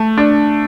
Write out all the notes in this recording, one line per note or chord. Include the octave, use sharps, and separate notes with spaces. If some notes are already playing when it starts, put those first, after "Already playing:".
Already playing: A3
D4